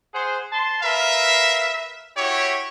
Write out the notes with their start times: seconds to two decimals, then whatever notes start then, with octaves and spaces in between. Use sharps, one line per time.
0.13 G#4 C5 F#5
0.52 A5 C6
0.83 A#4 B4 E5 F5
2.17 E4 F#4 G4 C#5